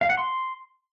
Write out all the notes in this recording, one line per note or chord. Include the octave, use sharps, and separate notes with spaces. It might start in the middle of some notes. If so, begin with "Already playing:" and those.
F5
F#5
C6